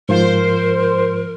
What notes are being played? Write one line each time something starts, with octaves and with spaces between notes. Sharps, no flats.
G#2 F3 F4 A#4 C5